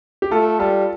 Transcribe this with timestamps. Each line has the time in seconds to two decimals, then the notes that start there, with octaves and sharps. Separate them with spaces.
0.22 G4
0.31 A3 F4 A4
0.59 G3 F4 A4